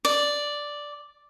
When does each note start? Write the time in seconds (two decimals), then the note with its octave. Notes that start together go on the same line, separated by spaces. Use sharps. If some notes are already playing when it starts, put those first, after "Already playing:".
0.05 D5